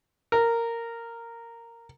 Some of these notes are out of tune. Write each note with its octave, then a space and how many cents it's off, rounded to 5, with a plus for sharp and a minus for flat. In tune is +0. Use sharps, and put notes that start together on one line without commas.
A#4 -10